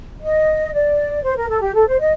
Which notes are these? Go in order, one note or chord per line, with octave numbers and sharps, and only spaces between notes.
D#5
D5
C5
A#4
A4
G4
A4
C5
D#5